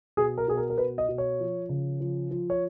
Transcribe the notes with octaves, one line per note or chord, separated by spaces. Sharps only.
B2 G#4
A#4
B2 G#4
A#4
A#4
B2 B4
D#5
B2
C#5
F3
C#3
F3
F3
C#5